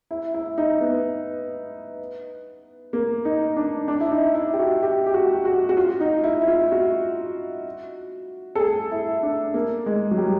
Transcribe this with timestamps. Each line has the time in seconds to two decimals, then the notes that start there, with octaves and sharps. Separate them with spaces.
0.11 E4
0.34 E4
0.58 D#4
0.81 B3
2.93 A#3
3.25 D#4
3.57 D4
3.88 D4
4.00 E4
4.12 D#4
4.35 E4
4.53 G4
4.59 F#4
4.83 G4
5.06 G4
5.14 F#4
5.45 F#4
5.69 F#4
5.77 F4
6.00 D#4
6.24 E4
6.41 E4
6.48 F4
6.72 F#4
8.55 A4
8.60 G#4
8.91 E4
9.23 D4
9.54 A#3
9.86 G#3
10.11 F#3
10.17 G3